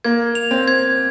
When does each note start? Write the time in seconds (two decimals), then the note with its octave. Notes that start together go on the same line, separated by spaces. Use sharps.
0.04 A#3 G#6
0.35 F7
0.51 C4
0.68 G#6